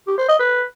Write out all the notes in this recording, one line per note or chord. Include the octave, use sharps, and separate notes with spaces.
G4
C5
D#5
B4